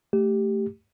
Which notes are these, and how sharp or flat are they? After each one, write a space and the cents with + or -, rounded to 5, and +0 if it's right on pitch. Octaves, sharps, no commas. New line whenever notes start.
A3 +0 G4 +0